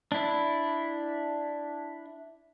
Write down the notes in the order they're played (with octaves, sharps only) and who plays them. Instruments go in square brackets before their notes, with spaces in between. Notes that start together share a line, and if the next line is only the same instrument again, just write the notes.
[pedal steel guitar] D4 E4